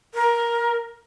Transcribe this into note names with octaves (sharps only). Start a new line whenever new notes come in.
A#4